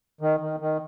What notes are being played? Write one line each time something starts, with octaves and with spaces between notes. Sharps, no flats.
D#3
D#3
D#3